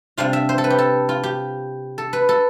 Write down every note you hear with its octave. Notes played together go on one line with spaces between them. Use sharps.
C3 G3 D4 F4 F5
E5
C5
A4
B4
G4
A4
F4
G4
A4
B4
A4